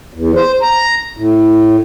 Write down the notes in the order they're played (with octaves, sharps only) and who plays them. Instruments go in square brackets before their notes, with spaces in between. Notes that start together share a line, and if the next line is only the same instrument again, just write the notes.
[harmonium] E2
C5
A#5
A2